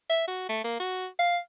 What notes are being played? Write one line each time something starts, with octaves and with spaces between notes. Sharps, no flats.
E5
F#4
A3
A#3
F#4
F5